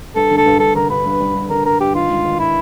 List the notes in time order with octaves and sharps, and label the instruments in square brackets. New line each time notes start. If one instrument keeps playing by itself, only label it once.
[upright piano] G2 [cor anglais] A4
[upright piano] D3
[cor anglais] A4
[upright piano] G2
[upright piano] G2 [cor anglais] A4
[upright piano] D3 [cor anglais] A#4
[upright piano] G2 [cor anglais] B4
[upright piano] G2
G3
G2
[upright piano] D3 [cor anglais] A#4
[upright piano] G2 [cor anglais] A#4
[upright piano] G2 [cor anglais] G4
[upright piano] D#3 [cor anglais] F4
[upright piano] G#2
D#3
[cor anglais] E4